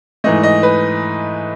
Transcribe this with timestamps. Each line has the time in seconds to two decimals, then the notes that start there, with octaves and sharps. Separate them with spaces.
0.24 G#2 E3 A3 D#5
0.43 D#5
0.63 B4